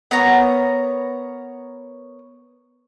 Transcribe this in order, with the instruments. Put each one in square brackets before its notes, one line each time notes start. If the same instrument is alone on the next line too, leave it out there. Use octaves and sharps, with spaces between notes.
[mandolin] B3 A#4 C#5 A#5